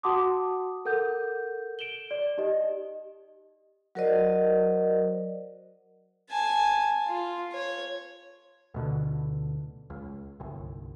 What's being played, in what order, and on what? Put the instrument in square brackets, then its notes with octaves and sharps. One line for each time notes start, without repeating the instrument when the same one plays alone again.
[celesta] F#4 F#5 A5 C6 D6 D#6
A4 A#4 F#5 G6
D7 E7 F#7 G7
D5
D#4 G4 D#5
[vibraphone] F#3 F#4 A#4 C5 D5 D#5
[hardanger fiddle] G#5 A5
F4
C#5
[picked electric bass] D2 B2 D3
C#2
G1 C2